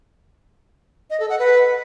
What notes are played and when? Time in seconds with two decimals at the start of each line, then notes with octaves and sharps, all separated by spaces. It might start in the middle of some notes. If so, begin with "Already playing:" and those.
1.10 D#5
1.20 A4
1.29 F#5
1.39 B4